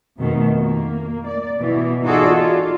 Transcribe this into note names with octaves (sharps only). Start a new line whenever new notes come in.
F2 B2 D#3 A3
A#3
D5
B2 E3
D#4 F4 F#4 G#4 A4 D5
F4